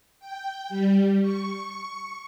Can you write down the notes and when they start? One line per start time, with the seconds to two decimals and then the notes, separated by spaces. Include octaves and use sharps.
0.20 G5
0.69 G3
1.22 C#6